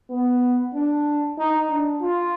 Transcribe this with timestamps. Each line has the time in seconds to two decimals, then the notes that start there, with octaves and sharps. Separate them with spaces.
0.10 B3
0.74 D4
1.38 D#4
1.70 D4
2.02 F4